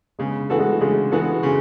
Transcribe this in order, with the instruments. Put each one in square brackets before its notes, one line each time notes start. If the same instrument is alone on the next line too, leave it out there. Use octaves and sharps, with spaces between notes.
[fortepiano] C#3 [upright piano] G#3 B3
[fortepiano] E3 B3 F#4 A4 [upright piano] A3
[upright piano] G#3
A3
[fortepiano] C#3 [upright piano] G#3
[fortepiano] E3 B3 F#4 A4
C#3